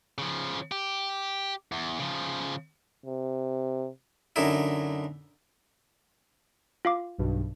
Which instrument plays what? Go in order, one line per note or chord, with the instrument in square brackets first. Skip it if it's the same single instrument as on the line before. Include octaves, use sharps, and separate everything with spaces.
[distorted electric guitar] C#3 F3
G4
E2
C#3 F3
[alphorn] C3
[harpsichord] F#2 D3 D#4 E4
[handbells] F4 F5 D6
[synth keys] B1 G2 B2